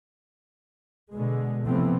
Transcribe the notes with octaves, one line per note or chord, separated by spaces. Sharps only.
B2 D3 G#3
C3 E3 F3 A3 B3 C4